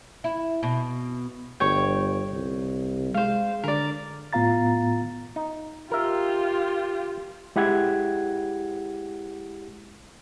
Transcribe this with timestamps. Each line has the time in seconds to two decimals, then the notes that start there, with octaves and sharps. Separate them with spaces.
0.24 E4
0.63 B2
1.60 G1 C#5 G5
2.32 C2
3.14 G#3 C5 F5
3.64 D3 A#4 D5
4.33 A2 B3 F4 F5 A#5 A6
5.36 D#4
5.92 F4 G4 A#4 E5
7.56 G#3 E4 G4 F#5 G#6